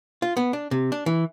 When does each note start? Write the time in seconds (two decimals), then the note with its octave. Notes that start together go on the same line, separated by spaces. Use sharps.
0.22 F4
0.37 B3
0.53 D4
0.71 C3
0.92 D4
1.06 E3